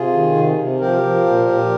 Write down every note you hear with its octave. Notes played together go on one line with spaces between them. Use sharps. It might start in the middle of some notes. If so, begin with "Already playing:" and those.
Already playing: C3 F4 G#4
D#3
C3
C3
F3 G4 A#4
F3
A#2
A#2